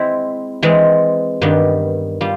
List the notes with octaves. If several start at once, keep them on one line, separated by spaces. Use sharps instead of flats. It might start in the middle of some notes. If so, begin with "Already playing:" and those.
Already playing: G#3 C4 E4
E3 G#3 C4
G2 D#3 G3 B3
G3 F4